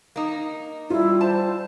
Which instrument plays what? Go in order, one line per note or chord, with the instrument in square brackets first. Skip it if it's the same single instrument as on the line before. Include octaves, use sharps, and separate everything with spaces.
[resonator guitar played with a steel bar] A#3 D#4
[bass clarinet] G3 [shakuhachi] E4 [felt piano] F4
[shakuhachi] C5 [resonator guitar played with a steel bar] A5